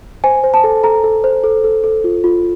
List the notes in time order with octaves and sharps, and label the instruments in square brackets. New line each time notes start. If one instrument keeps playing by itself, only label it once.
[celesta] C5 G#5
C5
A5
A4
A4 A#5
A4
C5
A4
A4
A4
F4
F4